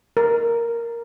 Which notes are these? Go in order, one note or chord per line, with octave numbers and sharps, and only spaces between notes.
A#4